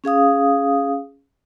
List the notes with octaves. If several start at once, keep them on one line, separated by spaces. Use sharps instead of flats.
C#4 G#4 F5 D#6